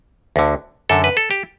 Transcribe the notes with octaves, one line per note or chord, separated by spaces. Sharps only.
D2 D3
F#2 D3 A4
B4
A4
G4